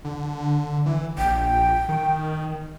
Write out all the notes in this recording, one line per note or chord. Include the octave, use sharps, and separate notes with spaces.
D3
E3
A#1 G5
D#3